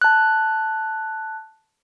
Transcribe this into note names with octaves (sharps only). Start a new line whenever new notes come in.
A5 F#6